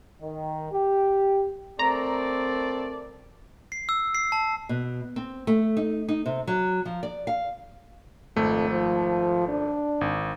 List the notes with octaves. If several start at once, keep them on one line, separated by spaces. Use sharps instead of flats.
D#3
G4
A3 C4 A#4 D5 A#5
C7
E6
C7
A5
B2
C4
A3
D#4
D#4
C3
F#3
F3
D5
F5
G#1 F2 A3
F3
D4
G#1